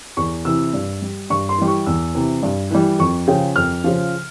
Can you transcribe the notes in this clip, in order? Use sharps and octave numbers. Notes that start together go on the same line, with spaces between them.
E2 C#6
C3 E3 E6
G2
G3
G2 C#6
C6
E3 G3
C#6
E2 E6
C3 E3
G2
E3 G3
F2 C#6
C#3 F3 G5
F2 F6
C#3 F3